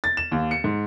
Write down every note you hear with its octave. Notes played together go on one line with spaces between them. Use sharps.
A6
E7
D#2
C#7
G#2